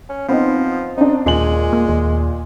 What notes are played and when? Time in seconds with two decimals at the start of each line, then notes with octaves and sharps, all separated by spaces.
0.09 C#4
0.29 F3 B3 C4 D#4
0.97 C4 D4 D#4
1.26 D#2 A#2 G#3 G#5 F#7
1.73 A#3
1.89 D#2